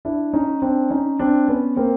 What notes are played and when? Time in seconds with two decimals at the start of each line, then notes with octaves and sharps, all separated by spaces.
0.05 D4 E4
0.33 C#4 D#4
0.62 C4 D4
0.90 C#4 D#4
1.19 C4 D4
1.48 B3 C#4
1.76 A#3 C4